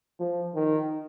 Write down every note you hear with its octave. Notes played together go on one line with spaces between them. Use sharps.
F3
D#3